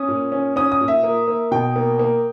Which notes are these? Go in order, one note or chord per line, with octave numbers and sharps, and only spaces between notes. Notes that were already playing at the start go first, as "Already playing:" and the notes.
Already playing: C#4 D#6
A#2
C#4
C#4 D#6
D#6
A#2
E5
A#3
A#3
B2 G5
A#3
A#3